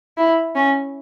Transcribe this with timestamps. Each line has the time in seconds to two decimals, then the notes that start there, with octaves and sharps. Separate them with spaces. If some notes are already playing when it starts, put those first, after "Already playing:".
0.17 E4
0.55 C#4